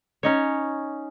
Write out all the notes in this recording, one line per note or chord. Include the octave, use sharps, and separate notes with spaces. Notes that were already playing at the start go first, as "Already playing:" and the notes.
C#4 D#4 C#5